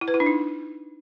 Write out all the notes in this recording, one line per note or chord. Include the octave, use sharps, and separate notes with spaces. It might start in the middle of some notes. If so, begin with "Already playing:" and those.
E4
B4
E4
D4
D#4